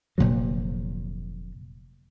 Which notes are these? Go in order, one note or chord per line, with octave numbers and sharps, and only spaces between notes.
F1 A#2 D3 F#3